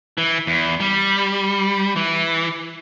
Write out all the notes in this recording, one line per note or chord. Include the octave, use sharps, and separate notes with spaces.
E3
E2
G3
E3